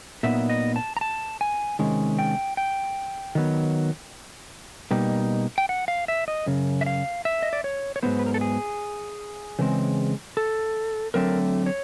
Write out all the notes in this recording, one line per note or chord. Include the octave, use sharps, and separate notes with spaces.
A#2 F#3 B3 D#4 E5
D#5
A5
A#5
A5
G#5
C3 D#3 G#3 C#4
G5
G5
D#3 F#3 B3
B2 G3 A#3 D#4
G5
F#5
F5
E5
D#5
F#2 C#3
E5
F5
E5
D#5
D5
C#5
C#5
G#2 D#3 F#3 B3 C5
B4
A#4
A4
G#4
C#3 E3 G#3 C4
A4
D3 F#3 A3 C4 A#4
C#5